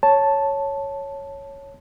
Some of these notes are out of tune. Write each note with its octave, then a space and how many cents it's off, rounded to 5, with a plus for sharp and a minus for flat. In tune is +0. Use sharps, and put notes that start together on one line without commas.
C#5 +0 A5 +0